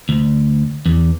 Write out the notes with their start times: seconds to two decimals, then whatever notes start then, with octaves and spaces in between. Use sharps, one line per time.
0.09 D2
0.86 E2